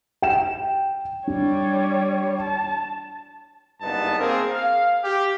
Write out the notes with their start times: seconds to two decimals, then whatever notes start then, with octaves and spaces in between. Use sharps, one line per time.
0.22 G5 E7
1.27 G3 D4 C#5
2.41 A5
3.81 F#1 G2 B3 D#4 A5
4.18 A#3 C4 G#4 A#4
4.49 F5
5.03 G4